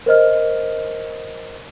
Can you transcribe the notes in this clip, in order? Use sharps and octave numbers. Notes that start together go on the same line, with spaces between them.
A#4 C5 D#5 F6